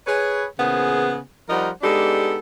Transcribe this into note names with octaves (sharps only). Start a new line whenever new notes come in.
G#4 B4 C#5
A#2 C#3 E3 B3 G#4 C5
F3 G3 D#4 A#4 C5 F#5
G#3 B3 D4 D#4 G4 A4